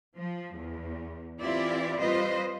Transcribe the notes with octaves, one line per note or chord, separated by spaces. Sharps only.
F3
E2
E3 C4 E4 F4 G4 D5
G3 C4 F4 B4 C5 D#5